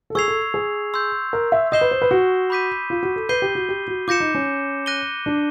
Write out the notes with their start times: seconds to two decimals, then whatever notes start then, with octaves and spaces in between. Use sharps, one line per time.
0.10 A4
0.15 G#4 C#6 E6 G#6 C7 F7
0.28 A4
0.54 G#4
0.94 C6 E6 G6
1.33 A#4
1.52 E5
1.72 D#5 D#6 G6 C7 E7 G7
1.81 B4
1.91 C5
2.02 B4
2.11 F#4
2.50 B5 D6 G6 B6 D#7
2.90 F4
3.03 F#4
3.16 A4
3.29 B4 G6 C7 D#7 G7
3.42 G4
3.55 F#4
3.69 G4
3.88 F#4
4.08 F4 D6 G6 A#6 C#7 E7
4.20 D#4
4.34 C#4
4.86 F#6 A#6 D#7 G7
5.26 D4